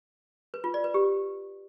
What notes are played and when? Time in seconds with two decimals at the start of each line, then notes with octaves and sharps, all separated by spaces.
0.54 B4
0.64 F4
0.74 D5
0.84 B4
0.94 G4